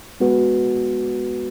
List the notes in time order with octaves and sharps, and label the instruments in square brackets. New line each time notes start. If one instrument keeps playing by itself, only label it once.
[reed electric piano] G#3 B3 F#4 B4